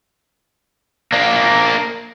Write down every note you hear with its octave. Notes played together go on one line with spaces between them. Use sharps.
A#3 D4